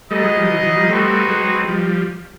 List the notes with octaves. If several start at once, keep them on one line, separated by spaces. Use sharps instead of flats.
G3 A3 B3 D#4 G#4 B4 D#5
F#3 G#3
F3 G3
E3 F#3
E3 F#3
F3 G3
G3 A3 C4 D#4 F#4 B4
F#3 G#3
F3 G3